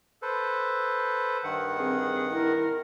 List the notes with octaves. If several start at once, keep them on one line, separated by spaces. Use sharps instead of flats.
A4 B4 C5
G2 D#3 F#5
C4 G#4
E4 A#4